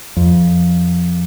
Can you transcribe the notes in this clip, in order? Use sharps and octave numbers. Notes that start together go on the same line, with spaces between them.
F2